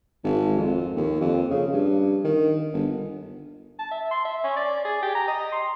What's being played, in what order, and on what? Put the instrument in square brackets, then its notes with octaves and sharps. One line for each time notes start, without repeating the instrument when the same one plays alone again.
[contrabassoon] G#1
F2
D#2
F2
C#3
G2
D#3
G1
[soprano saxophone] A5
E5
C6
E5
C#4
D5
G#4
G4
A#5
D#5
C6